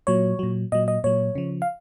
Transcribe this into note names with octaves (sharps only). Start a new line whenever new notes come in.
A#2 F#3 C#5
A#2 F#3
A#2 F#3 D#5
D#5
A#2 F#3 C#5
C#3 F3
F5